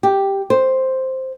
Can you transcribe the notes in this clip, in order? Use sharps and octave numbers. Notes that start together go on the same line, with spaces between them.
G4
C5